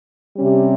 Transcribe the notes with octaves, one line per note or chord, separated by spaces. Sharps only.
C3 G3 C#4